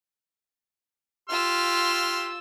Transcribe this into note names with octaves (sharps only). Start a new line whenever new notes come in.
F4 G4 C6 E6 F6